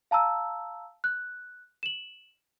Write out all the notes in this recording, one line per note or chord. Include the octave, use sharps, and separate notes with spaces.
F5 A5 A#5 E6
F#6
E7 F#7